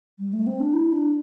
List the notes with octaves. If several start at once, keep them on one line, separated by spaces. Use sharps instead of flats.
G3
A3
C4
D4
E4
D4